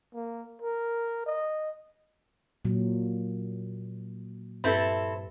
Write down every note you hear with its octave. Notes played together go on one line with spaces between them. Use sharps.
A#3
A#4
D#5
A#2 F#3
G2 C4 E4 A4 B4 G6